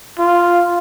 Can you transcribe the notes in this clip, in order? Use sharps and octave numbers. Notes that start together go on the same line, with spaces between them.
F4